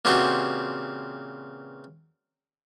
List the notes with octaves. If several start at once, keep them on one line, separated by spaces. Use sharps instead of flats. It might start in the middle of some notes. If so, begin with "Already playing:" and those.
A#2 C#3 E3 C4 F#4 G4